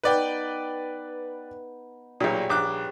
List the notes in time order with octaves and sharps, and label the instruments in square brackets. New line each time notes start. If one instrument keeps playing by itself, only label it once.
[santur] B3 D#4 [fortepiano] B4 D5 G5
[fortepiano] B1 A#2 [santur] G3 G#4 C#5
[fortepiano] A#1 D6 F#6